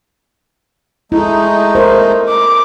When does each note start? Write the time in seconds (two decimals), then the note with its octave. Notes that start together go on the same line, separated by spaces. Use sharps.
1.12 G#3 A3 D#4 E4
1.75 A#4 C5
2.29 D6